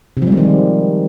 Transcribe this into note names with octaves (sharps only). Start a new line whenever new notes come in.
C3
F3
G3
G#3
D#3